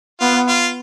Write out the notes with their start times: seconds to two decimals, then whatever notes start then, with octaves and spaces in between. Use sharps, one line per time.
0.20 B3 F4
0.48 F4